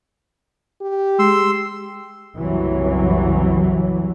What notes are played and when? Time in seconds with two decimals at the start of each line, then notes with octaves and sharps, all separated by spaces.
0.81 G4
1.19 G#3 C6 E6
2.35 F#1 C2 E3 F#3